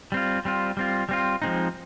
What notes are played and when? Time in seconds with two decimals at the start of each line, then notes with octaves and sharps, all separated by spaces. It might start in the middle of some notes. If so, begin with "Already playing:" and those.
0.12 G3 C4 F4
0.45 G3 C4 F4
0.77 G3 C4 F4
1.09 G3 C4 F4
1.42 F3 G#3 C4 D#4